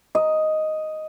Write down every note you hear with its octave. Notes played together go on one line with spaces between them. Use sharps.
D#5